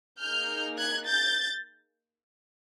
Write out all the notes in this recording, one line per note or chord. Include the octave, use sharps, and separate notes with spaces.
A#3 D#4 G#4 F6 G6
F#6 G#6
G6 A6